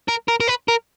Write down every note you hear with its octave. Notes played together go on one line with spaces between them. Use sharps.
A#4
A#4
A#4
B4
A#4